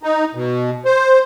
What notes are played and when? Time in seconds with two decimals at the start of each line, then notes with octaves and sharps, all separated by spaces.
0.03 D#4
0.35 B2
0.85 C5